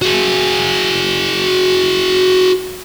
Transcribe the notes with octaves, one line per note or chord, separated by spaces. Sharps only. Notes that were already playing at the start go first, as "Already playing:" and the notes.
F#4 G#4